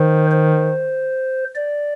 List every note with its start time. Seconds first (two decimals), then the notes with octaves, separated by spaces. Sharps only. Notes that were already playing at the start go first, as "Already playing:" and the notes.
Already playing: D#3 C5
0.31 C5
1.55 D5